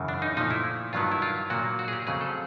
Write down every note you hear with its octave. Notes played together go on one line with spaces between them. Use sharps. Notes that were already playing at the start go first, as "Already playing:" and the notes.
Already playing: F#2 C#3 E3
D4
D#4
A#2 F3 A3 D#4
E4
G2 D#3 F#3 B3 F4
E4
F4
A#2 F#3 A#3 F#4
F#4
G#4
G4
F2 C#3 F#3 A3 G#4
A4